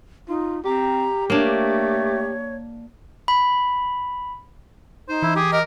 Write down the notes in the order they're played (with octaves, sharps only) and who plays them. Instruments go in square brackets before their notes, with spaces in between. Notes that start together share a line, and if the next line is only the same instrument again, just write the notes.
[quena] D#4 [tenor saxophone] F4
[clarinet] C4 [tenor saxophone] G4 [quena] A#5
[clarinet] A3 [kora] A#3 D4 [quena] C#5
[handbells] B5
[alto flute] D#4 [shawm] C5
[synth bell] E3 [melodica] E4
[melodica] G4 [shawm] G#4
[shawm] A#4 [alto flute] D#5